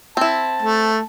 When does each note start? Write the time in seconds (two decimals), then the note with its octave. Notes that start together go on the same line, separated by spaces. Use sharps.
0.17 C4 E4 A5
0.62 A3